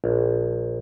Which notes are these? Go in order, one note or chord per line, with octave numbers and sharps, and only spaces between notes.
A#1